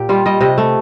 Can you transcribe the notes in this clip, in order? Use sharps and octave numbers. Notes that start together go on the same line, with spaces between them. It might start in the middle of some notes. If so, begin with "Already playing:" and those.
Already playing: A#2 G4
G3 F4
G3 D#5
C3 D#5
A3